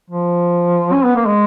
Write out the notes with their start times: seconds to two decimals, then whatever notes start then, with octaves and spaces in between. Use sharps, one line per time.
0.10 F3
0.93 C#4
1.04 B3
1.16 A#3
1.26 G#3